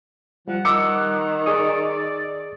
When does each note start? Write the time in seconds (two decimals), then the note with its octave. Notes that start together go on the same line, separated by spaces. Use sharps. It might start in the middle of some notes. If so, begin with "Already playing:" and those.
0.48 F3 G3 F#5
0.65 D#3 D6 E6 C#7
1.46 G#4 D5 C#6 D#6